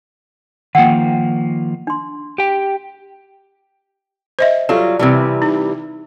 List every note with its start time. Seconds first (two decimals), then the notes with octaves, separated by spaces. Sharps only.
0.75 D#3 F3 A#3 F#5 G5
1.87 D4 C6
2.38 G4 G5
4.39 C5 D#5 E5
4.69 F#3 G3 F4 A4
4.99 C3 E3 G3
5.42 D#4